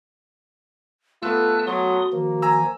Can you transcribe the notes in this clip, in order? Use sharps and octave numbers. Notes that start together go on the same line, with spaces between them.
A3 B3 F4 A4 A5 E6 F#6
F#3 F#4 C6 D#6
D#3 F3 A#3
G#5 A#5 E6